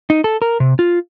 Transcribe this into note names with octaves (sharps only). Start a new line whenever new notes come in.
D#4
A4
A#4
C3
F4